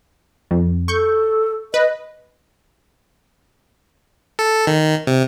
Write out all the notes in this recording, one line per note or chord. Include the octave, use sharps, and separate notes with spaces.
F2
A4 C#6 G6
B4 D#5
A4
D#3
C3